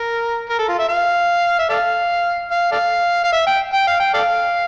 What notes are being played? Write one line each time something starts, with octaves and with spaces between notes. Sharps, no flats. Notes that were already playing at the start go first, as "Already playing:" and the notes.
Already playing: A#4
A#4
A4
F4
E5
F5
E5
A4 D5 F5
F5
A4 D5 F5
F5
E5
G5
G5
F5
G5
A4 D5 F5